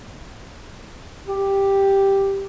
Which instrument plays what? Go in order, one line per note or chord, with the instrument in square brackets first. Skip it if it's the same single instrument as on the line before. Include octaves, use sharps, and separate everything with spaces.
[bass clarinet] G4